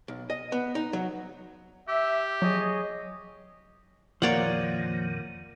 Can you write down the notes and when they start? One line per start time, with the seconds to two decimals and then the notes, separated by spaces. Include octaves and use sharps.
0.08 B1
0.30 D#5
0.52 B3
0.75 D#4
0.93 F#3
1.88 G4 E5
2.42 F#3 G#4 C#5 D#5
4.22 F2 A#2 D#3 F3 A#3 C#5 D5 F#5